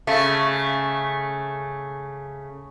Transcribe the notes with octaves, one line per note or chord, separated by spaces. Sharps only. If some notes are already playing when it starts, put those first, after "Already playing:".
C#3 A3